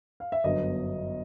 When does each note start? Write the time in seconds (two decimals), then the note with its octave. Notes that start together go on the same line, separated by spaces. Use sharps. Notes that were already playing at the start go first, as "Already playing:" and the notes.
0.20 F5
0.32 E5
0.44 G1 F#2 D3 F#3 B3 D#5